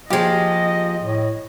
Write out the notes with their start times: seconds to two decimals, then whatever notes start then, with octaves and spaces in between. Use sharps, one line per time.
0.10 D#2 F3 G4 G#4 D#5
1.00 A2